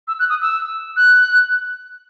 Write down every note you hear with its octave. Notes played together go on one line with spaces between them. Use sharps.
E6
F#6
D#6
E6
F#6